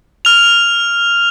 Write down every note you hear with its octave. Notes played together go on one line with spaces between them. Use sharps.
F6 F7